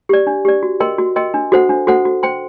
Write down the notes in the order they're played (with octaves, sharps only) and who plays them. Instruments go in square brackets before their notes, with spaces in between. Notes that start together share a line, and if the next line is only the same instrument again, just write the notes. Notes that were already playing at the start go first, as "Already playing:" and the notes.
[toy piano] G4 D5
D4
G4 D5
F#4
A#4 D#5 G5 C6
F#4
A#4 D#5 G5 C6
D4
F#4 A4 C5 F#5
D4
F#4 A4 C5 F#5
F#4
C5 G5 C6